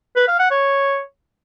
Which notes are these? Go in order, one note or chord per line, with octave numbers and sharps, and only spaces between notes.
B4
F5
F#5
C#5